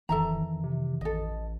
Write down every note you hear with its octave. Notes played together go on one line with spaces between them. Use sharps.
D1 F2 D#3 E3 A4 E5 A#5
C3
A1 A4 D#5